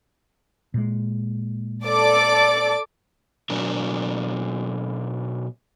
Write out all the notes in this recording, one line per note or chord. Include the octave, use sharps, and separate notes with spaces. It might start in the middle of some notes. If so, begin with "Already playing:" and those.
A#2 G#3
A4 D5 D6
B2 F#3 D4 A#4